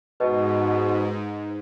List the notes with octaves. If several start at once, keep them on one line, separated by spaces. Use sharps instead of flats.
G#2 B2 B4 D#5